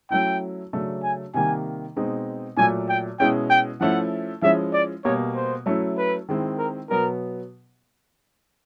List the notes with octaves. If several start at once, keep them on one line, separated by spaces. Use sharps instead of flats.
F#3 A3 C#4 E4 G5
C#3 F#3 A3 D4
G#5
C3 D#3 G3 A#3 G#5
B2 G#3 C4 D#4
A#2 F#3 A3 G#5
G5
B2 G#3 C#4 E4 G5
G5
F3 A3 C#4 E4 F#5
F3 G#3 C#4 E4 E5
D5
B2 G3 A#3 C#5
C5
F#3 A3 C#4 E4
B4
D#3 G#3 C4 E4
A#4
B2 F#3 B3 A#4